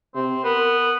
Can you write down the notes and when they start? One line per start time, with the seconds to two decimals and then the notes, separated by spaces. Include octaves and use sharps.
0.15 C3 C4
0.44 B3 A#4